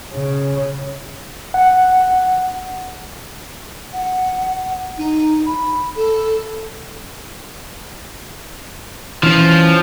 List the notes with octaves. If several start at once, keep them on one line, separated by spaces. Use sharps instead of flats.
C#3
F#5
F#5
D#4
B5
A4
E3 F3 C#4